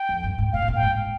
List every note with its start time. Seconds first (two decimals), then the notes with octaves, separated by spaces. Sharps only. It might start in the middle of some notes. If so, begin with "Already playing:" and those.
Already playing: G5
0.09 F2
0.24 G2
0.38 G#2
0.53 A#2 F5
0.62 G#2
0.68 A#2
0.76 G5
0.83 G#2